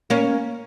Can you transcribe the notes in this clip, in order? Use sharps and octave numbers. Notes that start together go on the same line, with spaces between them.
A#3 C#4